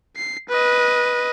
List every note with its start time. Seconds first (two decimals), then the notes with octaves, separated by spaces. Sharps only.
0.16 C7
0.49 B4 D#5